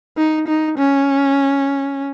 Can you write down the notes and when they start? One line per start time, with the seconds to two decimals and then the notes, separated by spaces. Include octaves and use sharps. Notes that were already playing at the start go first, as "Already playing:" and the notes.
0.17 D#4
0.48 D#4
0.78 C#4